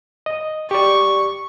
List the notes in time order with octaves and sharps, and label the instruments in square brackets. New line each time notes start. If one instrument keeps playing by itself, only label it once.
[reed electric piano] D#5
[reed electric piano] G4 D5 [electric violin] C#6